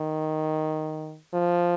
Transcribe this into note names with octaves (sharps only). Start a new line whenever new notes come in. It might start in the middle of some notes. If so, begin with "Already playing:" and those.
Already playing: D#3
F3